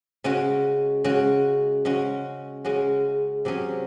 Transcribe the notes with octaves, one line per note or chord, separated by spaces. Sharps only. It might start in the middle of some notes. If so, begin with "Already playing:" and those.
C#3 G#3 C#4 F#4
C#3 G#3 C#4 F#4
C#3 G#3 C#4 F#4
C#3 G#3 C#4 F#4
C3 F#3 C#4 G#4